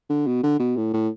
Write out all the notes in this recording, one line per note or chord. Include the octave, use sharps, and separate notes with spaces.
D3
B2
D3
B2
A2
A2